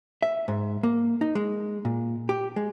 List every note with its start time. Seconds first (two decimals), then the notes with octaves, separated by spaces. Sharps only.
0.22 E5
0.48 G#2
0.83 A#3
1.21 D#4
1.35 G#3
1.85 A#2
2.29 G4
2.56 G#3